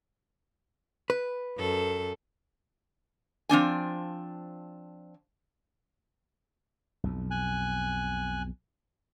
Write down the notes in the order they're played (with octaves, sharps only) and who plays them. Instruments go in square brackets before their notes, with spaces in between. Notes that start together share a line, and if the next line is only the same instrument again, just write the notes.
[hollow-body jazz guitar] B4
[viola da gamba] F#2 A4
[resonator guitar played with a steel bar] F3 C4 D4 G#5
[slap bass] B1 F2
[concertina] G#5 F#6